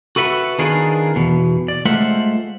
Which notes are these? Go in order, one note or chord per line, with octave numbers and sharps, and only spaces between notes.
F#4 A4 B4 E5 F#5
D#3 B3 D4 F4 G#4 A#4
E2 B2
D5
G#3 A3 F4 C5 E5 F#5